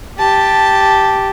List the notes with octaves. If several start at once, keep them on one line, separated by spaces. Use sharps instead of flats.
G4 A5